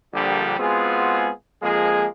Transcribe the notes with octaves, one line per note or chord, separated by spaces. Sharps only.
A#1 D3 G3
G#3 B3 C4 F4 F#4 G#4
F2 F3 G#3 A#3 G#4